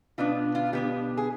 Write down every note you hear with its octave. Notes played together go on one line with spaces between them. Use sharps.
B2 B3 D4 F4
F4
B2 B3 D4 G4
G#4